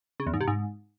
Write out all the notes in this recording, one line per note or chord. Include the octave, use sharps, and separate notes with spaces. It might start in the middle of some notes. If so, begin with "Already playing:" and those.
C#3
E2
G#2
C3
G#2